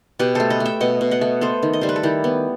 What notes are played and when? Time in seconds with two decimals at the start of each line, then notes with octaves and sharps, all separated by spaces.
0.19 B2 G4 B4
0.35 A3 A4 C5
0.50 B4 D#5
0.60 A3
0.65 E5 G5
0.81 B2 D#5 F#5
1.01 B2
1.11 D#5 F#5
1.21 A3
1.41 B3 A4 C5
1.63 D#3
1.73 D#5
1.81 G3 C5
1.89 B4
1.96 A4
2.03 D#3 E4 G4
2.24 B3